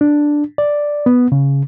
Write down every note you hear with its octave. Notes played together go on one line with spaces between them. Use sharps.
D4
D5
B3
C#3